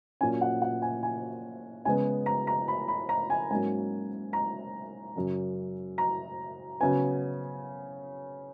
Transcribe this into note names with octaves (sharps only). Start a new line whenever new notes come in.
A#2 F#3 C#4 G#5
F#5
F#5
G#5
G#5
C#3 G#3 B3 G#5
A#5
A#5
B5
B5
A#5
G#5
G#2 F#3 A#3 C#4 G#5
A#5
F#2 C#3 F#3
A#5
C#3 F#3 B3 G#5